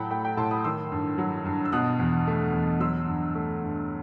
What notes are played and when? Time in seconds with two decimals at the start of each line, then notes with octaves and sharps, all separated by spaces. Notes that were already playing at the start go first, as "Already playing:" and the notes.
Already playing: A2 F#3 F#5 G5 A5 B5
0.11 A3 G5 B5
0.24 G5 B5
0.37 A2 A5 C6
0.51 B5 D#6
0.64 D#3 C6 E6
0.92 G2
1.18 F#3
1.45 G2
1.65 E6
1.72 B2 D#6 F#6
1.99 E2
2.27 A3
2.53 E2
2.80 F#3 C6 E6
3.07 G2
3.35 A3
3.62 G2